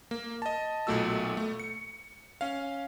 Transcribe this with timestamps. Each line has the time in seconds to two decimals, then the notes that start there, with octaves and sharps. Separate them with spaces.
0.11 A#3
0.42 D#5 A5
0.87 B1 A#2 A3 F#4 E6
1.37 A3
1.60 C#7
2.41 C#4 F5